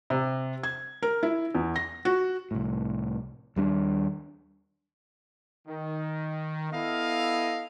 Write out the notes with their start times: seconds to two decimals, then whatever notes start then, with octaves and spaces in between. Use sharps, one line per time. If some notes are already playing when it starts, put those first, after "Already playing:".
0.10 C3
0.63 G#6
1.03 A#4
1.23 E4
1.55 E2
1.76 A#6
2.05 F#4
2.51 C2 A2
3.56 D#2 G3 D4
5.68 D#3
6.72 B3 E4 A4 D#5 F5